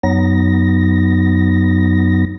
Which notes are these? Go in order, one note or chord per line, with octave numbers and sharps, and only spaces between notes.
F#2 F#3 B3 D#4 A#6